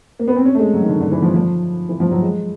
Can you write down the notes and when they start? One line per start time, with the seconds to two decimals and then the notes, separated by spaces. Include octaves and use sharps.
0.19 A#3
0.28 B3
0.36 C4
0.45 C#4
0.55 A3
0.59 G#3
0.74 F#3
0.82 D#3
0.88 D3
1.01 D3
1.12 E3
1.22 F3
1.34 F3
1.89 E3
2.00 F3
2.11 F#3
2.22 G#3